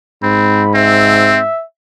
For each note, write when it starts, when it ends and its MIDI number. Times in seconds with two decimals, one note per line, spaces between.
0.23 1.50 44
0.23 0.63 60
0.23 0.70 83
0.75 1.38 60
0.75 1.64 76